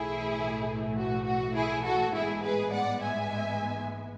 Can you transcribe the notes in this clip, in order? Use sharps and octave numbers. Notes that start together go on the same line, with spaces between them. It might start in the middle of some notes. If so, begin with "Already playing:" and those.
Already playing: B1 A2 E3 A3 E4 G#4
F#4
F#4
E4 G#4
F#4 A4
A1 G#2 G#3 B3 E4 G#4
G#4 B4
D5 F#5
E5 G#5